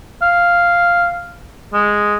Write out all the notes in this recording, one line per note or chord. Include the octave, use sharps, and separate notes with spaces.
F5
G#3